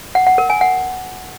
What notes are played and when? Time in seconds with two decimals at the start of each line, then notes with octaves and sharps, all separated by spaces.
0.15 F#5
0.27 F#5
0.38 A#4
0.50 G#5
0.61 F#5